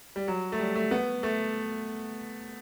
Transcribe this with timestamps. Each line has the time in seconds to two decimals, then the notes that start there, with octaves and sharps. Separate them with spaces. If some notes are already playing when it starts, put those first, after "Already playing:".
0.16 G3
0.28 F#3
0.52 A3
0.59 G3
0.75 A3
0.91 B3
1.23 A3